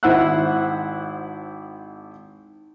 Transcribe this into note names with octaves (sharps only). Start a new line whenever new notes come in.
G#1 E4 C5 F#5 E6 F#6